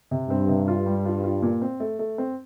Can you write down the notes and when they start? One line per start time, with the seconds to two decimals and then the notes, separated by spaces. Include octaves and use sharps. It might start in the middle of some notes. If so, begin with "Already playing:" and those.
0.11 C3
0.30 G2 C4
0.49 C3
0.68 F4
0.86 G3
1.05 F4
1.24 F4
1.42 A#2
1.62 C4
1.80 A3
1.99 A3
2.18 C4